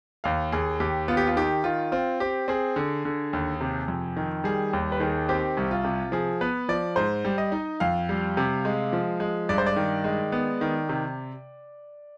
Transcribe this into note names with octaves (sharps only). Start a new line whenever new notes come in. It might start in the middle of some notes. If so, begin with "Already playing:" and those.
D#2 F5
D#2 G#4
D#2 G4
B3 F4
G4
F4
D#3 G4
D#3 F4
C4 F4
C4 G4
C4 G#4
D3
D3
D#2
C3
F2
D#3
G3 G#4
D#2
B4
D#3 G#4
C4 G4
C2
F4
C3
F3 G#4
B3 B4
F3 D5
G#2 C5
G3
D#5
D#4
F2 F5
G3
C3
G#3
F3
G#3
G2 D5
C5
D5
D#3
G#3
B3
D#3
C3